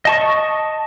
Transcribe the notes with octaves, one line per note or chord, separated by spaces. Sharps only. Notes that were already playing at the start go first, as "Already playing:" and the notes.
D#5 A5 C#6